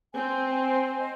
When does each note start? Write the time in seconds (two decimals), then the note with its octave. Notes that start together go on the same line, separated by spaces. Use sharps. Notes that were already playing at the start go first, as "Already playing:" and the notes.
0.14 C4 G#5
0.56 C5
0.98 D#5